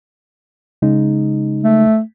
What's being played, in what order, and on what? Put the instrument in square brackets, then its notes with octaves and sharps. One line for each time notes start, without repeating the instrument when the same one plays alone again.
[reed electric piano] C#3 G#3 D#4
[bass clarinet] A3